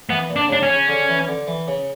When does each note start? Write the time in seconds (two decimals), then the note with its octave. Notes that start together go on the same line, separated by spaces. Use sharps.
0.10 E3 B3
0.30 A#2
0.36 D4
0.49 C#3 D4
0.63 C#4
0.70 C#3
0.88 D3
1.09 E3
1.28 D3
1.47 E3
1.68 C#3